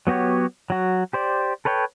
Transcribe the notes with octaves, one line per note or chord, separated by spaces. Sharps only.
F#3 B3 F#4 G4 C#5
F#3 F#4
G4 C5 D5
A4 B4 C#5 G5